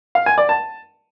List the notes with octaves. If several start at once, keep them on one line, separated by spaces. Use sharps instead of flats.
F5
G#5
D5
A5